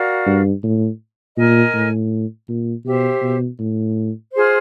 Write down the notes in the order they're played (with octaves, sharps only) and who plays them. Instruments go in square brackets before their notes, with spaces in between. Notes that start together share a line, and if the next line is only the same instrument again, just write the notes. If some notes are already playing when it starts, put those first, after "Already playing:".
Already playing: [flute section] F#4 A#4 D5 F5
[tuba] G2
A2
[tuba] A#2 [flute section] A#4 D#5 G#5
[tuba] A2
A#2
[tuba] B2 [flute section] G4 C5 E5
[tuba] B2
A2
[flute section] F4 G#4 C5